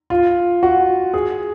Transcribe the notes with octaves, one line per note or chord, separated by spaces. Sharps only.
F4
F#4
G#4